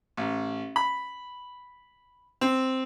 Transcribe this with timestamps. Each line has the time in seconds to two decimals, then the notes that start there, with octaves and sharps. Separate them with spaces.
0.17 A1
0.76 B5
2.41 C4